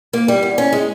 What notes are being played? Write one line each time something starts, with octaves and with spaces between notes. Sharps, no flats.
A#3
G3
E2
C#4
G#3